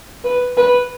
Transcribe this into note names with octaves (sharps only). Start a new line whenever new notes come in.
B4
B4